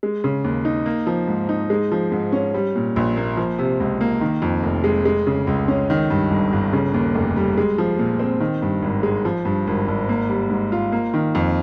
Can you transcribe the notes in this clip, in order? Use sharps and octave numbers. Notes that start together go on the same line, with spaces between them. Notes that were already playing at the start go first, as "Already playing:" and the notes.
G#3
C#3
D#2
D#4
A#3
F3
G#2
D#4
G#3
F3
G#2
C#4
G3
A#2
A#1
A#3
F3
C3
C#2
A#3
D#3
F2
F1
G#3
G#3
C#3
C#2
C#4
D#3
G2
G1
G1
C#3
D#2
F1
G3
G#3
F3
A#2
C4
D#3
G2
G#1
G#3
F3
G2
G#1
G#1
A#3
G3
G#2
F4
A#3
D#3
F2